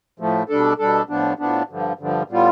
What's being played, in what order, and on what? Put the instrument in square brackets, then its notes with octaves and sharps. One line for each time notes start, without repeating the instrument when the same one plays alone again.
[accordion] A2 F3 A3
B2 G3 D4 A4
B2 G3 D4 A4
A2 F3 B3 D4
A2 F3 B3 D4
G2 D3 F3
G2 D3 F3
A2 G3 B3 F4